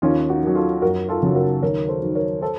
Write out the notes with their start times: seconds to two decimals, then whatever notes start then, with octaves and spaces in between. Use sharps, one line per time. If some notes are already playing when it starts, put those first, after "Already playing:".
0.02 D#2 C#4 F4
0.29 D#4 F#4
0.43 D#3 F#3
0.55 F4 A4
0.82 F#2 F#4 A#4
1.09 F4 A4
1.23 C#3 F#3
1.35 F#4 A#4
1.62 D#2 A#4 C#5
1.89 A4 C5
2.03 D#3 F#3
2.15 A#4 C#5
2.41 A4 C5